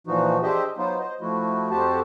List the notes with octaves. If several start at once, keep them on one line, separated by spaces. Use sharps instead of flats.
A#2 E3 F3 D#4 F#4
D4 G4 G#4 C5 D#5 E5
F#3 B3 D#4 F4 C5
C5 D#5
F3 A3 E4 F#4
F2 F#4 G4 A4 C5 A5